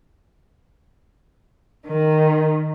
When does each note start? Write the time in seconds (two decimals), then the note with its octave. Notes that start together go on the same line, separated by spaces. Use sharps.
1.86 D#3